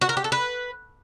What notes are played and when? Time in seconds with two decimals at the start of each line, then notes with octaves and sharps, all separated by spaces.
0.01 F#4
0.09 A#4
0.17 G4
0.24 A4
0.32 B4